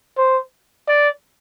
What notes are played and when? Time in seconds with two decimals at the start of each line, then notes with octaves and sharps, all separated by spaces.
0.18 C5
0.88 D5